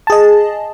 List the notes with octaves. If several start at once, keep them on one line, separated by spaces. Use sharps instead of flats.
G#4 D#5 A5